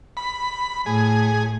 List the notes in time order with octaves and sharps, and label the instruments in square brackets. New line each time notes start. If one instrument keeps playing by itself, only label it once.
[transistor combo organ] B5
[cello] A2 A3 [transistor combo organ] G#4